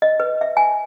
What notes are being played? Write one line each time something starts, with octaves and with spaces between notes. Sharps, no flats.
D#5
B4
E5
G#5